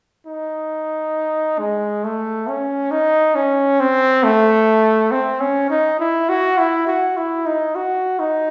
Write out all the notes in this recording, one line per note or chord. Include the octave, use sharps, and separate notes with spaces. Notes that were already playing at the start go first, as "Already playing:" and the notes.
D#4
G#3
A3
C#4
D#4
C#4
C4
A3
C4
C#4
D#4
E4
F#4
E4
F#4
E4
D#4
F#4
D#4